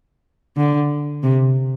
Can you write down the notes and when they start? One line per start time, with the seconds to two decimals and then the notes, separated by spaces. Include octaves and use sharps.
0.57 D3
1.23 C3